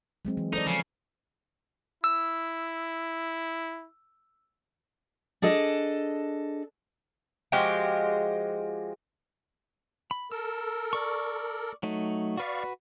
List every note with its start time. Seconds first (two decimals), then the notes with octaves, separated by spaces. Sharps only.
0.25 F#3 G#3 C4
0.37 E3
0.53 D#4 A4 C5 D5
0.67 C#3 F3
2.04 E4 E6
5.42 D4 G#4 A4 D#5
7.52 F3 G#3 F#4 G4
10.11 B5
10.32 A4 A#4 E6
10.93 D5 C#6
11.83 F#3 A3 D#4
12.37 F#4 B4 D5 F5 B5 C#6